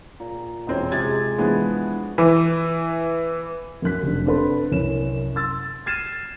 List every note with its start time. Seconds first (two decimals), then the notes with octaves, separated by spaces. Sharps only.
0.20 A#2
0.67 E1 C4 C#4
0.91 C3 G#3 G#6 A6
1.38 E3 F3 G#3 B3 D4 F#4
2.18 E3
3.82 F#2 F#3 F#6 B6
4.03 F1 F2 D4
4.26 C4 D4 A4 B4 B5 C6
4.71 C2 F#2 C#4 C#5 E7
5.35 C6 E6 A6
5.86 F6 G#6 A6 C7 D#7 E7